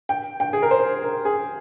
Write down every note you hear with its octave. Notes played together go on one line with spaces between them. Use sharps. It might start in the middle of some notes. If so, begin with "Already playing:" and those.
G5
G5
G#4
A#4
C5
A#4
G#4